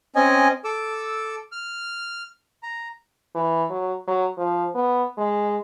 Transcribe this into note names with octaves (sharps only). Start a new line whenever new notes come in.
C4 C#4 D#5 G#5
A4 D6 E6
F6
A#5
E3
F#3
F#3
F3
B3
G#3